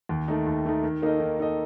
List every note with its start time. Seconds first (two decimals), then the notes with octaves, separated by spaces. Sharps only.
0.09 D#2
0.28 D#3 A3 D#4
0.47 D#2
0.65 D#3 A3 D#4
0.83 D#3
1.02 A#3 D#4 A4 D#5
1.20 D#3
1.39 A#3 D#4 A4 D#5